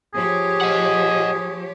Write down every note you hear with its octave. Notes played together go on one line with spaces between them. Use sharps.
F3 G4 G#4 C#5
D#5 F#5